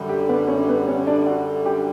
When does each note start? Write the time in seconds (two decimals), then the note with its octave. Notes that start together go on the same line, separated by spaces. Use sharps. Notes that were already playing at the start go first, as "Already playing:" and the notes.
Already playing: F#2 D3 G3
0.09 G4
0.29 B3 B4
0.48 C#4 C#5
0.68 B3 B4
0.88 C#4 C#5
1.07 D4 D5
1.27 F#4 F#5
1.66 G4 G5